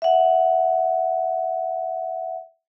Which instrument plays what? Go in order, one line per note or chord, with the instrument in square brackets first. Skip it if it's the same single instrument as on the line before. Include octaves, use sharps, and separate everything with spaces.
[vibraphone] E5 F#5